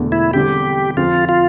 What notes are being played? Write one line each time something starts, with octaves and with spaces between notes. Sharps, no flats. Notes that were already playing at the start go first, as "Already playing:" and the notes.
Already playing: E1 E2 D3 A3
E4
E2 D3 G3 C4 G4
F2 D3 F3 F4
F4